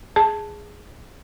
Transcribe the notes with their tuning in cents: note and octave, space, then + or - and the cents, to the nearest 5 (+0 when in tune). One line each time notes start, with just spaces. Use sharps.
G#4 +0 A5 +0